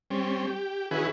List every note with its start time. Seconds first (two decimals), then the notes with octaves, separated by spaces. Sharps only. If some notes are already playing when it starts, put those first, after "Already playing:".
0.10 G3 C4 C#4
0.47 G4
0.91 D#3 C#4 E4 F#4 G#4 B4